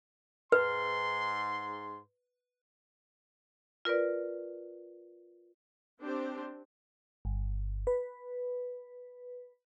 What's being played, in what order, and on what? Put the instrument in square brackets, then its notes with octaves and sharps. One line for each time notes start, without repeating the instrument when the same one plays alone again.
[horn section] G#2 C6 [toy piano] B4
[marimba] F4 A#4 B4 D5
[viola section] C4 D4 G4 C5
[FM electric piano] G1
B4